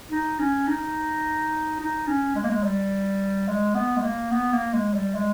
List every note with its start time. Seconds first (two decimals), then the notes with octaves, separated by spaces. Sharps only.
0.11 D#4
0.39 C#4
0.68 D#4
1.80 D#4
2.07 C#4
2.35 G#3
2.43 A#3
2.49 G#3
2.64 G3
3.48 G#3
3.75 B3
3.97 G#3
4.03 A#3
4.31 B3
4.52 A#3
4.73 G#3
4.94 G3
5.15 G#3